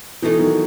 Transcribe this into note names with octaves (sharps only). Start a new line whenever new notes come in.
B2 E3 A3 D#4
D#3 F#3